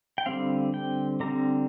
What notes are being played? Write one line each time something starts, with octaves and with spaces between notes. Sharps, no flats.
G5
D3 G3 C4 F5
G5
D3 G3 C4 A#5